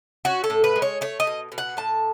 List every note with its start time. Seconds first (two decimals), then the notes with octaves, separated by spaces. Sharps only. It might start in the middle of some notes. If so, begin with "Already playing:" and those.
0.25 C#4 F#4
0.44 A4
0.50 A2
0.64 B4
0.76 G#3
0.82 C#5
1.01 A3 C#5
1.20 D#5
1.27 B2
1.52 B2
1.58 F#5
1.77 A2 A5